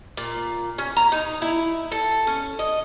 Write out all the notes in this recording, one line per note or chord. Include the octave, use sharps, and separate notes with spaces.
A#2
C#4
A#5
D#4
E4
A4
C#4
D#5